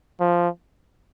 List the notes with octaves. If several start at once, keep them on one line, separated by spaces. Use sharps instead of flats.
F3